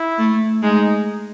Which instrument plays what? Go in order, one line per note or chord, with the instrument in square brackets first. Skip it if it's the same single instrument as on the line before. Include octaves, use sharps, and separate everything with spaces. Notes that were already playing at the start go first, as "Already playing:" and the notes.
Already playing: [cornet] E4
[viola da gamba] A3
[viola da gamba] G#3 [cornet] D#4